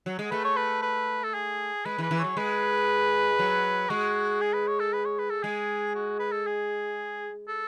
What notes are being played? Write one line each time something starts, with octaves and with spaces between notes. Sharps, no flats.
F#3
G#3
A3 B4
C#5
B4
B4
A4
G#4
G#3 B4
E3
B4
E3
C#5
F#3
G#3 B4
F#3
G#3 F#4
G#4
B4
C#5
A4
B4
C#5
B4
A4
G#3 G#4
F#4
B4
A4
G#4
A4